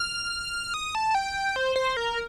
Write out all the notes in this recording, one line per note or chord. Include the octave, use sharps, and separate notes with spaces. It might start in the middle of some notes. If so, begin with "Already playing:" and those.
Already playing: F6
D#6
A5
G5
C5
C5
A#4